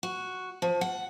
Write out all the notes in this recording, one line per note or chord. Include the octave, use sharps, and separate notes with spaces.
F#4
F3
F#5